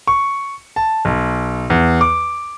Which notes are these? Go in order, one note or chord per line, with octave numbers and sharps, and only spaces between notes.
C#6
A5
B1
E2
D6